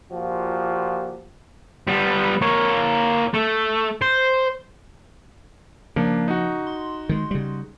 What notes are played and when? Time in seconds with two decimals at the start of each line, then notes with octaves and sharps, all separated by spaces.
0.12 A#2 F3 F#4 G4
1.88 G3 B3
2.42 A#3 C#5
3.34 A3
4.02 C5
5.96 C#3 F3 A#3 D4
6.28 D#4 F#4
6.67 C6
7.09 D#3 G#3
7.31 C#3 G3